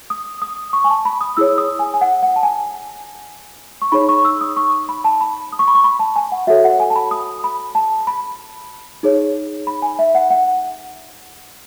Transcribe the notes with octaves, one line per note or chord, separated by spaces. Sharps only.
D#6
D#6
C#6
G#5
A5
B5
D#6
E4 G#4 C#5 E6
D#6
G#5
G#5
F#5
F#5
A5
G#5
C#6
D#4 G#4 C#5 B5
C#6
E6
D#6
C#6
B5
A5
B5
D#6
C#6
B5
C#6
B5
A5
G#5
F#5
F#4 A4 C#5 E5
F#5
G#5
A5
B5
D#6
B5
A5
B5
D#4 G#4 C#5
B5
G#5
E5
F#5
F#5